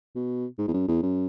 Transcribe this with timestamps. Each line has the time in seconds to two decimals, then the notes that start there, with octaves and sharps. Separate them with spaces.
0.15 B2
0.59 G#2
0.68 E2
0.74 F#2
0.88 E2
1.03 F#2